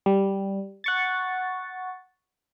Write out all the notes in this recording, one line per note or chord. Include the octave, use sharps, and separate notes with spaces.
G3
F#5 C#6 A6